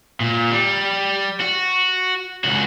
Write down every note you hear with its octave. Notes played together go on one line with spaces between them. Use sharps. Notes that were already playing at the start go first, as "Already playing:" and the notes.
A#2
G3
F#4
C#2 F#4